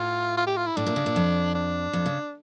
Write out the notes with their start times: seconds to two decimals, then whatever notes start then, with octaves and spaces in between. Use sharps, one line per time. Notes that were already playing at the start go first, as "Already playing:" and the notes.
Already playing: A2 F4
0.37 F4
0.47 G4
0.57 F4
0.66 E4
0.76 A2 D4
0.86 A#2
0.96 C#3
1.06 A#2
1.16 F2
1.54 D4
1.93 F2
2.06 C#3